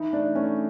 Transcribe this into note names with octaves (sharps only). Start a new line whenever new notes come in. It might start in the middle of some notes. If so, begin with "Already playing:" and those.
Already playing: E3 D#4
A3 D4
A3 C#4